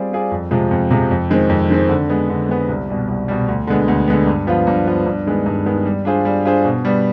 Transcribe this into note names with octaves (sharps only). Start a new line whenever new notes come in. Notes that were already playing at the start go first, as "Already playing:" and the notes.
Already playing: G3 C4 F4 G#4 D5
C4 F4 G#4 D5
F2
C3 F3 G#3
F2
C3 F3 G#3
F2
D#3 G#3 C4
F2
D#3 G#3 C4
D3
G#3 B3
D3
G#3 B3
C2
B2 G3
C2
B2 G3
D2
D3 G#3 B3
D2
D3 G#3 B3
G2
F3 B3 F4
G2
F3 B3 F4
G2
D#3 G#3 B3
G2
D#3 G#3 B3
G3
D4 F4 G#4 C5
G3
D4 F4 G#4 C5
B2
G3 B3